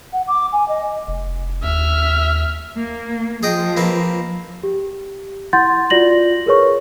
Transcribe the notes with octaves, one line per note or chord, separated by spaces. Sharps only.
F#5
D6
G#5
D#5
F1
D#2 E5 F6
A#3
F3 G#4 D#5 G5
A#3 C4 B4
G4
E4 F#5 C6 G6 A6
F4 F#4 D5 A#6 F#7
G#4 A#4 B4 C#5 C#6